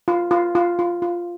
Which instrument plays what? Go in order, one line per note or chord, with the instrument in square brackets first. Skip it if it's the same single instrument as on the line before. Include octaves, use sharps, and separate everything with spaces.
[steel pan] F4
F4
F4
F4
F4